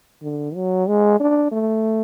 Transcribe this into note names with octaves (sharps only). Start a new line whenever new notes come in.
D3
F#3
G#3
D4
A3